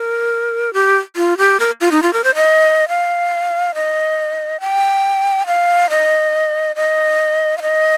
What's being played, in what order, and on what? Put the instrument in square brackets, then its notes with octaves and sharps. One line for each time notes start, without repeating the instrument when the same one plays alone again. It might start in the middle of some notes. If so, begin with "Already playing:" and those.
Already playing: [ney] A#4
G4
F4
G4
A#4
F4
D#4
F4
A#4
C5
D#5
F5
D#5
G5
F5
D#5
D#5
F5
D#5